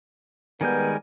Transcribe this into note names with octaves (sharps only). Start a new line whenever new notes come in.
D#3 G3 G#3 B3 A#4 G#5 G6